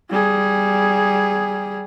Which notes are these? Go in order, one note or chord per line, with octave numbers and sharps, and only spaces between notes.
G3 G#4